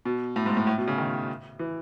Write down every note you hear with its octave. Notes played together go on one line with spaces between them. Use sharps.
B2
A2
G#2
A2
A2
B2
C#3
D#3
E3